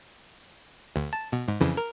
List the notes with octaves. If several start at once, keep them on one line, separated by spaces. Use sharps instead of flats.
D2
A5
B2
G#2
F2 C#3 E3
A#4